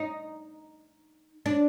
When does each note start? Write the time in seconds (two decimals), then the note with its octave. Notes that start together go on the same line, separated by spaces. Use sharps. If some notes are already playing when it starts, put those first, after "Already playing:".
Already playing: D#4
1.46 D4